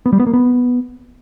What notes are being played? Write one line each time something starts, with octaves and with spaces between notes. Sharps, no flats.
B3
G3
B3
A#3
B3